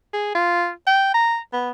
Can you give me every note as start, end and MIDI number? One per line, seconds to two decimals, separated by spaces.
0.13 0.32 68
0.35 0.70 65
0.87 1.09 79
1.14 1.37 82
1.53 1.71 59